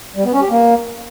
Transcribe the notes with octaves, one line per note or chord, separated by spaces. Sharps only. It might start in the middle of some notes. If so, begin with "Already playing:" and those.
G3
B3
C#4
G4
A#3